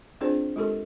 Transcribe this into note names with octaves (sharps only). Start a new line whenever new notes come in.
C4 D4 F4 G#4 C5 D5
G#3 F4 G4 A4 A#4